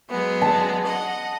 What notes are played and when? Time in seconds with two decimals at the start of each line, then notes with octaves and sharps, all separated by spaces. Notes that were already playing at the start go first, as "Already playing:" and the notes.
0.10 F#3 G#3 B3
0.42 A5
0.85 D#5 F#5